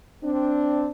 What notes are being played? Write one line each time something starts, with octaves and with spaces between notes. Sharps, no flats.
C4 D4